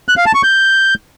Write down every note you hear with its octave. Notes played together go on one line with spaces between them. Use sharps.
F#6
F5
A5
C#6
G6